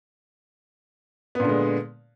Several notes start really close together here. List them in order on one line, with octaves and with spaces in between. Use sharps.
B3 A#2 D3 G#3